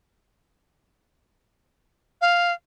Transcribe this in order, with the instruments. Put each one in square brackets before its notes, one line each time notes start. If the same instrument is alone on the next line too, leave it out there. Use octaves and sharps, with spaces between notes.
[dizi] F5